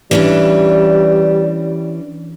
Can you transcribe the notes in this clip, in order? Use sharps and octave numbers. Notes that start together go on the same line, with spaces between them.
E3 G3 C#4 D4